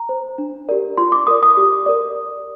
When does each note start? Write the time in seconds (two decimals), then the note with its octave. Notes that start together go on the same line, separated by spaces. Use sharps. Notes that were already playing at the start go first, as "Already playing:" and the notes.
Already playing: A#5
0.09 C5
0.38 D4
0.69 G4 A#4 D5
0.97 F4 C6
1.12 D6
1.27 A#4 D5 D#6
1.43 D#6
1.57 G4
1.86 A#4 D5